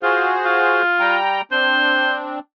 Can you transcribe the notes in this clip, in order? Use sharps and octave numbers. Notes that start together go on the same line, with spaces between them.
F4 F#4 G#4 C5
F4
G3 G5 A#5
C4 D4 C5